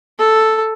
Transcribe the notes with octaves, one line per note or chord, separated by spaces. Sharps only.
A4